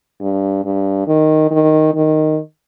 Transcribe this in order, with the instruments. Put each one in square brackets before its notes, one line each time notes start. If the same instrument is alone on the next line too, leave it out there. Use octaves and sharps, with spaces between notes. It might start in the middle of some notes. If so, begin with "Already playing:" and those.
[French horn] G2
G2
D#3
D#3
D#3